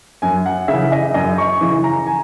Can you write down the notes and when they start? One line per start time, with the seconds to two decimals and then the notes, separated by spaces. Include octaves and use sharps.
0.22 F#2 G#5
0.46 F#5
0.68 C#3 E3 E5
0.92 D#5
1.14 F#2 D#5
1.38 C#6
1.61 C#3 E3
1.84 A#5
2.07 G#5